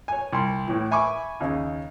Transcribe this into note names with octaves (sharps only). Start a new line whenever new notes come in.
C#5 G#5
C2 C6
A2 E3
E5 G#5 B5 C#6 D6
D#2 C#3